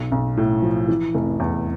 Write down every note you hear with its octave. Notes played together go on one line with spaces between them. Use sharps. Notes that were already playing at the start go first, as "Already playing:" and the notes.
Already playing: B1
B1
A2
F3
E3
F1
E2